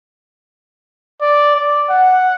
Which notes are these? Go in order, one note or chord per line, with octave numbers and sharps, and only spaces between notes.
D5
D5
F#5